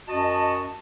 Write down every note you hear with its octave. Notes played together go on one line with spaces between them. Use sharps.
F#2 F#4 D#5 A5